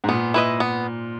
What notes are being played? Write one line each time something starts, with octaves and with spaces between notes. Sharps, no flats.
G#2
A#2 B3
E4 B4 D#5
B3